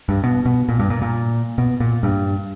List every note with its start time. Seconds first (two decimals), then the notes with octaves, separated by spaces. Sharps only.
0.09 G2
0.24 B2
0.45 B2
0.69 A#2
0.79 G2
0.90 A#2
1.02 A#2
1.58 B2
1.80 A#2
2.03 G2